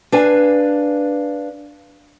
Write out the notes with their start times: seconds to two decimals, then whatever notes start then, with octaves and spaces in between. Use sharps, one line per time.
0.12 D4 B4 F5 G#5